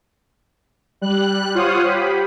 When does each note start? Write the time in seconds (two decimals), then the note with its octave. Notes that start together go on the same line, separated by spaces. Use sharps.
1.01 G3 F#6
1.55 F4 C5 C#5 F5 F#5 D#6
1.84 G4 B5